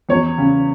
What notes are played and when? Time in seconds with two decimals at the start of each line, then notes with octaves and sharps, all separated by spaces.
0.09 E2 C#5
0.38 C#3